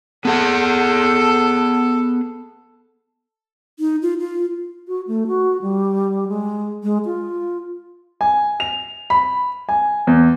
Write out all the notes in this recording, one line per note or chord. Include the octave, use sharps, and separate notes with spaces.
B3 G#4 A4 F#5
D#4
F4
F4
F#4
A3
F#4
G3
G#3
G#3
F4
G#5
F7
B5
G#5
E2